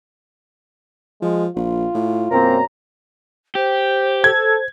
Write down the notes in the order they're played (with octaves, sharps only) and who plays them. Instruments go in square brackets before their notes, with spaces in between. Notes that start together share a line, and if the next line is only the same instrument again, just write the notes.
[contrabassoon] F3 [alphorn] G#3
[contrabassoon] A#1 [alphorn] F4
[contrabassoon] A2
[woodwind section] F#2 A#5 [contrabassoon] B2 [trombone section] A#3 C4
[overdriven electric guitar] G4 [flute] C5
[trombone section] A4 [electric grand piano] G#6